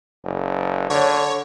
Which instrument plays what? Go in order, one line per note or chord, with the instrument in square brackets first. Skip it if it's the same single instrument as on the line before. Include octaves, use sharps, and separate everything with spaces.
[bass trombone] F#1
[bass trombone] D3 [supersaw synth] C#5